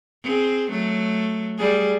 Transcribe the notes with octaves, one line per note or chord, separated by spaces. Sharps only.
C4 G#4
F#3 A3
G3 G#4